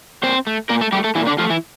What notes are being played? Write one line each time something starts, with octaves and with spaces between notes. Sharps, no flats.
A#2 C4 C5
A3
A#2 A#3 A#4
A3 A4
G3 A3 G4
A3 A4
A#2 E3 E4
D3 D4
F3 A3 F4
E3 E4